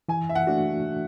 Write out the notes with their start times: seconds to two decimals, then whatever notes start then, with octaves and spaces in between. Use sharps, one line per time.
0.09 E3 G#5
0.29 E5
0.35 F#5
0.47 A3 D4 F#4